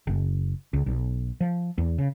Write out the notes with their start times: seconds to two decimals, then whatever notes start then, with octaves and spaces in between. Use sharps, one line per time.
0.07 F#1
0.73 C#2
0.86 B1
1.41 F3
1.78 E2
1.98 C#3